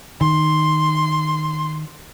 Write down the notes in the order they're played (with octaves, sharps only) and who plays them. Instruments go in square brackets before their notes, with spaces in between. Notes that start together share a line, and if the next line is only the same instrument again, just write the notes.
[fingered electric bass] D#3 [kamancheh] C6